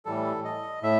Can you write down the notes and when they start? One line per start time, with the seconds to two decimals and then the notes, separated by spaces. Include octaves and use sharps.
0.05 A2 E3 G3 A4
0.45 D#5
0.82 A2 E5